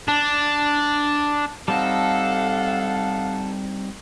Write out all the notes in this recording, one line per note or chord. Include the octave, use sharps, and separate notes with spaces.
D4
G3 C4 D#4 A4 F5 F#5